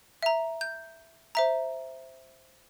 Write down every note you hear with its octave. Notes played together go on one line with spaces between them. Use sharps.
E5 A#5
G6
C5 E5 A#5